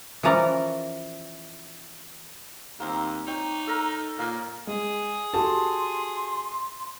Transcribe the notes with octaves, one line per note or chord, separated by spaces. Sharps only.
E3 F3 C#4 A#4 D5
D#2 A#3 C4
D#4 C#5 G5
A4 A#4
A#2 A#3 F5
G#3 G#4
F#4 G4 A4 A5 C6